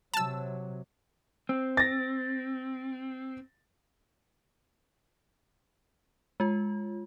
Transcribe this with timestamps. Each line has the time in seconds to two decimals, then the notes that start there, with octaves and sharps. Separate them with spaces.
0.14 C3 F#3 A5 E6
1.49 C4
1.77 A6 A#6
6.40 G#3 F4